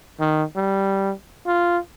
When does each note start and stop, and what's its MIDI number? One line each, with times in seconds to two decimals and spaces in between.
0.20 0.43 51
0.56 1.11 55
1.47 1.78 65